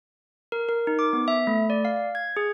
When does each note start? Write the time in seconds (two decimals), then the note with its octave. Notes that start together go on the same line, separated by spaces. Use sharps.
0.52 A#4
0.69 A#4
0.87 D#4
0.99 D6
1.13 B3
1.28 E5
1.47 A3
1.70 D5
1.85 F5
2.15 G#6
2.37 G#4